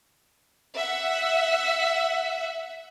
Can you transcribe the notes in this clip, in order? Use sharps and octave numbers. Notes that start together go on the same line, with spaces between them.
E5 F#5